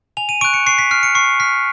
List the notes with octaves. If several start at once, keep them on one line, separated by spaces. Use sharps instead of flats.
G#5 F7
D#7
C#6 F#6 D7
C#7
C#6 C7
B6
F6 C7
C#7
C#6 C7
F6 B6